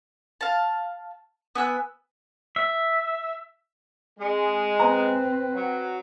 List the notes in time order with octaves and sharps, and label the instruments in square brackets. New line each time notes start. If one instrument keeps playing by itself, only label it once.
[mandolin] F5 A5
B3 G#5 E6 F#6
[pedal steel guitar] E5
[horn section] G#3 [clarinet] C4
[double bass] C4 [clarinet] B4 [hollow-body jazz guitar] A#5
[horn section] F#3